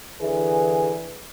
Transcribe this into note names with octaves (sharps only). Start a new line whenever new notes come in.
D3 E3 G#4